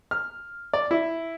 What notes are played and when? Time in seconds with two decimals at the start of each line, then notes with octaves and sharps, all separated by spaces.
0.11 F6
0.73 D5
0.91 E4